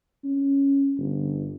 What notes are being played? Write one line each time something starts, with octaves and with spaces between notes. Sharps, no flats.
C#4
G1